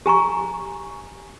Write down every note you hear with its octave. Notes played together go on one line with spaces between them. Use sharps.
G4 G#5 A#5 C#6